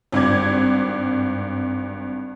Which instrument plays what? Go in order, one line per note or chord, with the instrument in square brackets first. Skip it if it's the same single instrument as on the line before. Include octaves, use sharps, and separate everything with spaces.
[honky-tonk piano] G#1 G2 D6 G#6